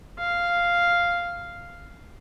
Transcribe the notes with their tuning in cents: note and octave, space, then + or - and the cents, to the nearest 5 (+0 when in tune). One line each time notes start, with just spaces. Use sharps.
F5 -5